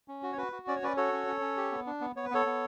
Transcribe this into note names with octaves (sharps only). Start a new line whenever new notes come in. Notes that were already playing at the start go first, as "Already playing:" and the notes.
C#4
F#4
C#5
F#4 B4
F#4
C#4 D5
C#5
C#4 B4 D5
F#4 A4 C#5
C#4
C#4
C#4
G4
B3
D4
B3
B3 C#5
B4
B3 A4 C#5
B3